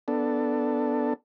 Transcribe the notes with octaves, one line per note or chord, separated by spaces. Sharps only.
B3 D4 A4